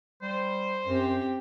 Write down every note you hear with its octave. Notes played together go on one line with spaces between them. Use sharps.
G3 C5
F#2 C4 G4